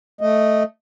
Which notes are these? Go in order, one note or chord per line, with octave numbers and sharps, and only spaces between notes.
A3 D#5